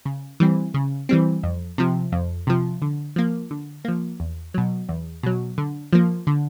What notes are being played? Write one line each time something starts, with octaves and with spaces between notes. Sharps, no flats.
C#3
E3 G3 C4
C#3
E3 G3 C4
F2
C3 F3
F2
C3 F3
D3
F3 A#3
D3
F3 A#3
E2
B2 F#3
E2
B2 F#3
D3
F3 A#3
D3